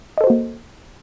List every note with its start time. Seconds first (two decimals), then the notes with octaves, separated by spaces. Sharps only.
0.18 D#5
0.21 A4
0.24 C5
0.27 F#4
0.30 A#3